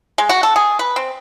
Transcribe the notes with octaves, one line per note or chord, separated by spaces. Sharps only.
G#3
F#4
A4
G#4
B4
C4